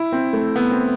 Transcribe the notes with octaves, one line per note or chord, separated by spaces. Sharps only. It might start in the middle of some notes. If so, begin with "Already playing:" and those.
Already playing: E4
C4
A3
B3
C4